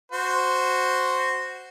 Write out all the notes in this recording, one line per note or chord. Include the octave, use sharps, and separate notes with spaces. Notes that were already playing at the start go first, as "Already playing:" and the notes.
F#4 C5